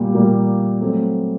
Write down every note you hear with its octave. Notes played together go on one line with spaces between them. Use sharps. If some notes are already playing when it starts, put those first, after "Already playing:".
Already playing: A#2 G3 A#3
A#2 G3 A#3
F#3 A3 C4